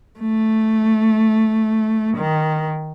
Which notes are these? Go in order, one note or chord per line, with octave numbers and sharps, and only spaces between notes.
A3
D#3